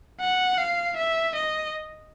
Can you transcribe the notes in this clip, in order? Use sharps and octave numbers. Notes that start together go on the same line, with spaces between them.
F#5
F5
E5
D#5